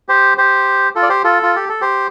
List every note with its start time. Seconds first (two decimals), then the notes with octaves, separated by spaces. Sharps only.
0.09 G4 C5
0.38 G4 C5
0.95 F4 A4
1.03 D5
1.09 G4 C5
1.24 F4 A4
1.43 F4
1.56 G4
1.69 A4
1.81 G4 C5